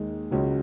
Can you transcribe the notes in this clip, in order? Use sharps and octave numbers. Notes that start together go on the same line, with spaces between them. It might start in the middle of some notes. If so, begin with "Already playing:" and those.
Already playing: D#2 D#3 G#3
C#2 C#3 F#3 C#4